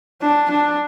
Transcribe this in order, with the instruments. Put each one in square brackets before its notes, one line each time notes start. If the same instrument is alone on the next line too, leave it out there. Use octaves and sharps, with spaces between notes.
[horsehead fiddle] D4
D4